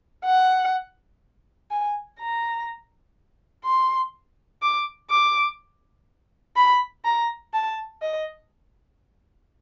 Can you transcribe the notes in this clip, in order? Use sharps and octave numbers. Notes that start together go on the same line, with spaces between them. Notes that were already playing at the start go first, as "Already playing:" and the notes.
F#5
G#5
A#5
C6
D6
D6
B5
A#5
A5
D#5